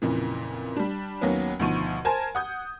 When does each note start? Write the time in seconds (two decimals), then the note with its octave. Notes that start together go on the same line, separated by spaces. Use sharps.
0.02 F2 A#2 C#3 E3
0.77 G3 D4
1.21 D#2 F#3 A#3 B3 C#4
1.59 D2 B2 D#3 F3 C#6 D#7
2.05 A#4 C5 G#5 A5 G#6
2.35 F#5 D#6 G6